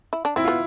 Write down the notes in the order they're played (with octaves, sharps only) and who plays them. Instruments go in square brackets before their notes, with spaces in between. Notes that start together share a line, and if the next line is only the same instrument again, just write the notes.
[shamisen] E4
D4
[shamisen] C4 [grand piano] E4
[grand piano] F4
[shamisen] B3